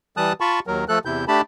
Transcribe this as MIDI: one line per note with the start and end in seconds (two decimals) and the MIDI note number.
0.17 0.33 52
0.17 0.33 55
0.17 0.33 81
0.17 0.33 87
0.17 0.33 90
0.41 0.60 65
0.41 0.60 81
0.41 0.60 83
0.41 0.60 85
0.67 0.84 39
0.67 0.84 54
0.67 0.84 70
0.88 0.99 53
0.88 0.99 57
0.88 0.99 69
0.88 0.99 90
1.05 1.25 40
1.05 1.25 48
1.05 1.25 64
1.05 1.25 91
1.28 1.41 57
1.28 1.41 62
1.28 1.41 67
1.28 1.41 81
1.28 1.41 83